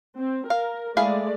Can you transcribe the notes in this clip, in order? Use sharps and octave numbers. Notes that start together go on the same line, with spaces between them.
C4
A#4 F5
G#3 A3 E4 G#4 D5 F5